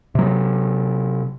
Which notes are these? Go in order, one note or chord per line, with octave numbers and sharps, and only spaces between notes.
C3 F#3